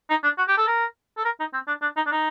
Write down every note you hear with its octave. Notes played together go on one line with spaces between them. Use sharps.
D#4
D4
F#4
G4
A4
A#4
A4
A#4
D#4
C4
D4
D4
D#4
D4
D#4